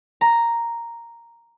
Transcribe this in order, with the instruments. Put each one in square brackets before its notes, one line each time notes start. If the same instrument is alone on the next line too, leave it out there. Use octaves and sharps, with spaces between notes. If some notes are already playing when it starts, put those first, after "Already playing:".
[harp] A#5